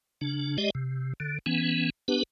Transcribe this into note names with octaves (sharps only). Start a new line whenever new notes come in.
C#3 D4
G#3 G4 D5 D#5
C3
D3
E3 B3 C#4
B3 D4 G4 B4